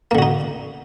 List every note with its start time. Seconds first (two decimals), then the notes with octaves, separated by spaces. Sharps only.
0.11 A#3
0.15 D3
0.18 F#4
0.22 D#4